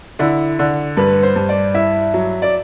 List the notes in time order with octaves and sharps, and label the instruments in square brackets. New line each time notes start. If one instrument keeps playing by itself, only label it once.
[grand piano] D3 [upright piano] E4
[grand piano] D3
[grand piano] G2 [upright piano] B4
[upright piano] C5
[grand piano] G2
[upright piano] D5
[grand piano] E4 [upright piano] E5
[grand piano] F#3
[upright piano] D5